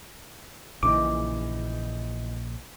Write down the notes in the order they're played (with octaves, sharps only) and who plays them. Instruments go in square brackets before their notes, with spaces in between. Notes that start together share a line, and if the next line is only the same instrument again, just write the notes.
[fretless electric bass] A#1 A#2 C#3 [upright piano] E3 D#4 [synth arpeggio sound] D6